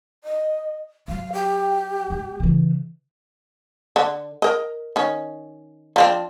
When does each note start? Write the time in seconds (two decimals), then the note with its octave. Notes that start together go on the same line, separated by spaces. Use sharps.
0.24 D#5
1.08 F#3 F5
1.33 G4
2.10 G#3 B3
2.40 C#3 E3
3.96 D3
4.42 A#4 D#5
4.96 D#3 C#4
5.96 F3 C4 D4